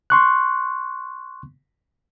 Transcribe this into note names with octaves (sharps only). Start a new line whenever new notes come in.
C6 C#6 F#6